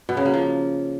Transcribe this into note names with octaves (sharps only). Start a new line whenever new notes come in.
B2
C#3
A#3
F3